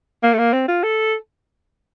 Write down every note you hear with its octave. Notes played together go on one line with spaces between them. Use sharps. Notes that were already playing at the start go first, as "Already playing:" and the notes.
A#3
A3
A#3
C4
F4
A4